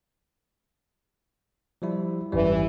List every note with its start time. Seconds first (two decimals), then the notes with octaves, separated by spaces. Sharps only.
1.82 F3 G3 E4
2.32 G#1 F#2 E3 G3